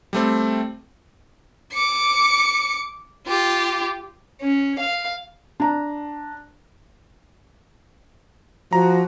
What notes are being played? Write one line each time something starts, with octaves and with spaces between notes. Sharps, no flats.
G3 A3 C4
D6 C#7
F4 G4
C#4
F5
D4 A#5
F3 F#4 A#5